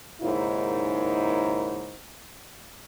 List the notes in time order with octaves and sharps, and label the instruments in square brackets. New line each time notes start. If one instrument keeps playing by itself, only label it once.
[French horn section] D#2 G#2 C#3 D#4 E4 A#4